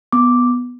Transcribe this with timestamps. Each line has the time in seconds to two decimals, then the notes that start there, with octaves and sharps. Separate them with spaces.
0.12 B3 D6